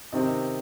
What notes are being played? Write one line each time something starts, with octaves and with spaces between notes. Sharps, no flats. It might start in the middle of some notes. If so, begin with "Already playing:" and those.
C3 D#3 C4 D#4 D#5